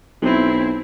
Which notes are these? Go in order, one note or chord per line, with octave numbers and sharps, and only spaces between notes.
B1 C4 E4